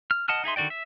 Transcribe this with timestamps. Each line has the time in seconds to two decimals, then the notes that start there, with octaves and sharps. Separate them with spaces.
0.11 F6
0.28 D#5 F#5 A5 D#6 F6
0.44 D#4 G#4 E5 C6
0.56 D3 D#3 F#4 D5 G5
0.70 E5